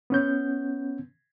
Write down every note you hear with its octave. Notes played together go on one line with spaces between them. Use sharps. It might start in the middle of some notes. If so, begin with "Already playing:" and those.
B3 C#4 G6